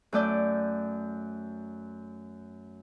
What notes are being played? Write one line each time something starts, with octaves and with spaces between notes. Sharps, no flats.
F#2 A3 D5 G6